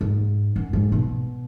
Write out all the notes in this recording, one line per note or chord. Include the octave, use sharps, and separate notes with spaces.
G#2
F#2
G#2
B2